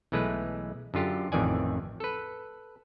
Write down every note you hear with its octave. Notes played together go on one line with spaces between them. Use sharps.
B1 E3 G#3 A3 B4
F#2 D3 F4 G4
A1 F2 D#3 E3 D5 G#5
A4 B4